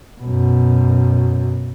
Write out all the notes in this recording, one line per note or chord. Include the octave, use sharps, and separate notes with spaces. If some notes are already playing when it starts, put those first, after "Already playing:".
F#2 B2